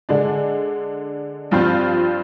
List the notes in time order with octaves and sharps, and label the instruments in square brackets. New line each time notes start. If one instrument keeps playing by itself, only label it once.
[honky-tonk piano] D3 G#3 D4
G2 F3 C4 F4